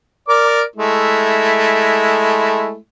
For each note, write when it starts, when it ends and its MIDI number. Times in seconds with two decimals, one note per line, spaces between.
0.28 0.62 70
0.28 0.62 74
0.28 0.62 86
0.76 2.76 56
0.76 2.76 57
0.76 2.76 64